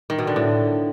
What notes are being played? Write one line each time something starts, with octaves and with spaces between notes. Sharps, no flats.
D#3
B2
D3
A2